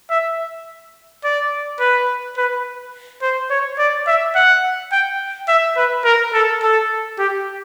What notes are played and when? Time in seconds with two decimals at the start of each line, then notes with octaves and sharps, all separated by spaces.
0.10 E5
1.24 D5
1.80 B4
2.38 B4
3.22 C5
3.51 C#5
3.79 D5
4.07 E5
4.35 F#5
4.92 G5
5.48 E5
5.77 B4
6.05 A#4
6.34 A4
6.63 A4
7.19 G4